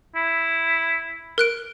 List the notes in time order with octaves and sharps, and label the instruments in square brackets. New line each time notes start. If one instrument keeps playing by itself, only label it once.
[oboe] E4
[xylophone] A#4 F#6 D7